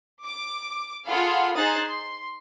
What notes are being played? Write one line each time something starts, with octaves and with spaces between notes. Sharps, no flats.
D6
F4 G#4 A4 F5 F#5 B5
D#4 G#4 C5 D#6 F#6 A6
C6